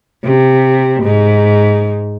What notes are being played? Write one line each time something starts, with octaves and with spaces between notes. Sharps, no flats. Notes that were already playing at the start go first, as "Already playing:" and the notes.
C3
G#2